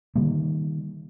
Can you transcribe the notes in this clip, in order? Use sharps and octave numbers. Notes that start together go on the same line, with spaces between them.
D3 D#3 G3 A#3